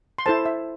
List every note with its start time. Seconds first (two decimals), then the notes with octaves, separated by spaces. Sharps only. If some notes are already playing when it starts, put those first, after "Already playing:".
0.18 C6
0.26 E4 A4 C5 A5
0.46 E5